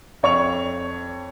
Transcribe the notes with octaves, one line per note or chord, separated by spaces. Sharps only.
F2 C#5 C#6 F7